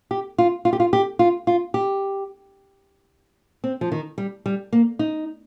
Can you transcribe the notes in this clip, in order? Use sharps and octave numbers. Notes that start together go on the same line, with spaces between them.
G4
F4
F4
G4
F4
G4
F4
F4
G4
C4
F3
D#3
G3
G3
A#3
D#4